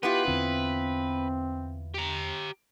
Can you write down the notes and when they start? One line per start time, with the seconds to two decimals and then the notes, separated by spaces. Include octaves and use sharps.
0.03 B3 E4 F4 G4 B4
0.25 E2 D3 C4 D4
1.94 G4 A#5